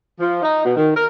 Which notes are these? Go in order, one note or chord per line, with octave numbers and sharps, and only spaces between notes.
F3
D#4
B2
D#3
A#4